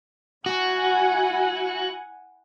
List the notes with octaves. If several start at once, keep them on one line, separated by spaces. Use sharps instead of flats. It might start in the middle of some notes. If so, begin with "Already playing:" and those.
E4 F#4 F#5 G#5